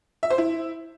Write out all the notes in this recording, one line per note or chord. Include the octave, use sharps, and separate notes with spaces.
E5
C5
E4